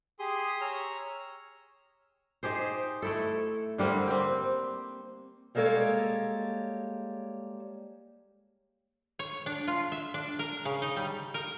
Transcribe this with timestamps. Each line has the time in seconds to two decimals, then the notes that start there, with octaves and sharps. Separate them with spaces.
0.19 G4 G#4 C6 D#6
0.61 C#5 A#5 E6 F6
2.43 D#4 G4 G#4 C5
3.02 A3 E4 A4
3.78 D3 G3 A#3 C4
4.07 C4 G4
5.55 G3 G#3 A#3 A4 C#5 D5
9.19 C#5
9.46 D4
9.68 F4
9.92 E5
10.14 D4
10.39 A#4
10.65 C#3
10.82 D#4
10.96 G3
11.34 A#4